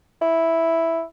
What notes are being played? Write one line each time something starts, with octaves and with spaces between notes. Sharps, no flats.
E4